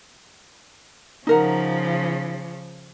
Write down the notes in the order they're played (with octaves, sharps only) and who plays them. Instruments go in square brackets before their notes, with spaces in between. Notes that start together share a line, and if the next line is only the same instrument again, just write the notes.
[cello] C#3 F3 [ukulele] D#4 A#4 F#5